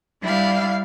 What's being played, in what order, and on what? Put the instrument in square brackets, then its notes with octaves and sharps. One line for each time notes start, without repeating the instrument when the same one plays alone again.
[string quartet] G3 D4 E4 F5